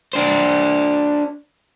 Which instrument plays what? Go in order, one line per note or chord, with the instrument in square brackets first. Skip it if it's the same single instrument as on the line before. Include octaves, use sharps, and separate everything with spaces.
[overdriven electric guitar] D4 C5